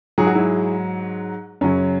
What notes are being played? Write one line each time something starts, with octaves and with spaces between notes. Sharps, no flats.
G#2 F#3 G#4
F#4
E4 G#4
F#2 C#3 F#3 C#4